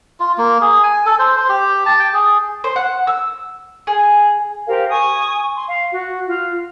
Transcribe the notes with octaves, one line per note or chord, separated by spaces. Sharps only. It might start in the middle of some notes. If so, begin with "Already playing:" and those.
F4
A#3
G#4
G#5
A4
C5
C5
G4
A5
G5
G#4
C5
F#5
E6
G#4
G4 A#4 C5 F5
G#5 C#6 D#6
C6
F5
F#4
F4